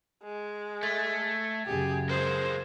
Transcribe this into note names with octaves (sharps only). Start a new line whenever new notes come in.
G#3
A3 G#6 A6
F#2 C#3 G4 G#4
G#3 A#3 C5